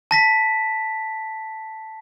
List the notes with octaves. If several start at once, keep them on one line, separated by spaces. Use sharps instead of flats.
A5 A#6 B6